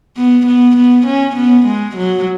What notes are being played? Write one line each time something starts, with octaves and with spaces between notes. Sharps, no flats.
B3
B3
B3
C#4
B3
G#3
F#3